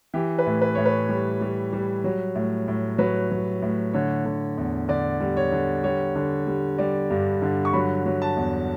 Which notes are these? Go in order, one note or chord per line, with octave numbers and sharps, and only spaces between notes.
E3 G4
B4
A2
B4
A2 C#5
B4
G3
G3
G3
F#3
A2
A2
F#3 B4
F#3
A2
D3 C#5
D3
E2
D3 D5
G3
C#5
D3
G3 C#5
D3
G3
G3 D5
G2
D3
C#6
F#3 B5
F#3
A5
E2